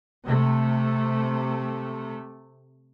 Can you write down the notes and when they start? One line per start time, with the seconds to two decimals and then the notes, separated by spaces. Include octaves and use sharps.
0.24 C3 A3